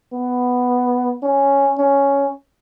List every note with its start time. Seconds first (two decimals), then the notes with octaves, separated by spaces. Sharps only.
0.13 B3
1.23 C#4
1.78 C#4